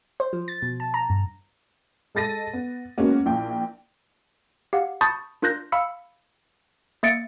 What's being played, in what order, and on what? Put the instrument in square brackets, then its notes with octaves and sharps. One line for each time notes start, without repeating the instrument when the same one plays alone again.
[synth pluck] C5
F3
A6
B2
A5
A#5
G2
[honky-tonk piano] G#3 A4 A6 A#6 D#7
B3
G#3 A#3 B3 C#4 F#4
A#1 E4 G5
[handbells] G4 F5 F#5
A5 B5 C#6 D#6 G6 A6
D4 F4 A#4 F#6 G6 A#6
F5 B5 E6 C#7
A#3 E5 A6 C#7 D7